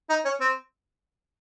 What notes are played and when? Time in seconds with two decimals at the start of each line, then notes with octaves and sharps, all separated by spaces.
0.10 D#4
0.25 C#4
0.40 C4